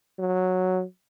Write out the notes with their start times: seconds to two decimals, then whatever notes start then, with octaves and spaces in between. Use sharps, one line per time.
0.19 F#3